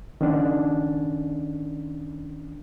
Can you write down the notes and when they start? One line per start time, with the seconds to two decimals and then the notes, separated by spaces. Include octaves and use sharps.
0.21 D#3 C#4 D4